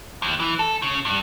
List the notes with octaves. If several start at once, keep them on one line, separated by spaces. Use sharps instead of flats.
D#2
E3
A4
C#3
G2